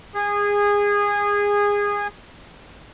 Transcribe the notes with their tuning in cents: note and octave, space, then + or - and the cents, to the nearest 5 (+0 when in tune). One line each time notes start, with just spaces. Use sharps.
G#4 -20